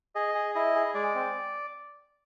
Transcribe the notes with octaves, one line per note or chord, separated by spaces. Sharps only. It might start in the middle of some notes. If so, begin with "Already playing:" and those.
G#4 D#5
G#4
E4 D#5
G#4
G#3 D5
C4